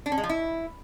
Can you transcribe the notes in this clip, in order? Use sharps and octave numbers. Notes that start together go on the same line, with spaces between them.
D4
C#4
G#3
F3
E4